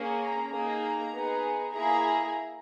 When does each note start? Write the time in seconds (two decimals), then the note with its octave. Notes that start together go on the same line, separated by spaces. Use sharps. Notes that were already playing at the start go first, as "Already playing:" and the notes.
Already playing: A#3 C#4 G#4
0.20 A#5
0.51 A#3 D#4 G#4 A#5
1.13 B3 D#4 G#4
1.74 A#3 E4 G#4 A#5